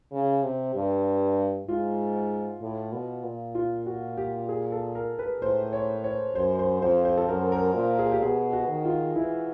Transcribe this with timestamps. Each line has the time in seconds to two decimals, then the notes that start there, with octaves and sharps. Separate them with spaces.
0.12 C#3
0.43 C3
0.75 G2
1.68 G#2 F4
2.62 A2
2.93 B2
3.24 A#2
3.55 F4
3.86 F#4
4.17 G4
4.49 G#4
4.72 A4
4.95 A#4
5.19 B4
5.42 A2 C5
5.73 C#5
6.04 C#5
6.35 F#2 C5
6.59 C5
6.82 F2 C5
7.05 C5
7.17 A4
7.28 F#2 A#4
7.52 A#4
7.75 A#2
7.99 G#4
8.12 G4
8.22 B2 G#4
8.53 F#4
8.69 D#3
8.85 F4
9.15 E3 E4